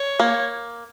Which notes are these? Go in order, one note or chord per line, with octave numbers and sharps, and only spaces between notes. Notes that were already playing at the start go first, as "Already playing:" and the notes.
Already playing: C#5
A#3